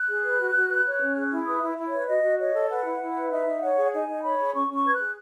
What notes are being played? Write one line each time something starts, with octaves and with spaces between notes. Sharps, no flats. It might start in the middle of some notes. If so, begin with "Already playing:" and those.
Already playing: F#6
G#4
B4
F#4
F#4
B4
C#5
C#4
G#4
E4
B4 D#6
E4
E4
C#5
B4
F#4 D#5
F#4
C#5 D#5
A4
B4 F#5
E4
E4
B4
D#4 E5
D#4
C#5 F#5
G#4
F#5
D#4 G#5
D#4
C#5 B5
G#4
C#4 C#6
C#4
C#6
B4 G#6
F#6
G#4